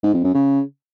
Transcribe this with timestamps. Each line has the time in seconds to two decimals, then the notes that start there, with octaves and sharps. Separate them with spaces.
0.03 G#2
0.14 F2
0.24 F#2
0.34 C#3